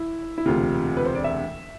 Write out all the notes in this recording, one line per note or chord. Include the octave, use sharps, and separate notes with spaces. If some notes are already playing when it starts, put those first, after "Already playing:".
Already playing: E4
E4
E1 D2 C3 F4
B4
C5
D5
E5